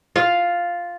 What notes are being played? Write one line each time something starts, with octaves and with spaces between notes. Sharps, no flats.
F4 F5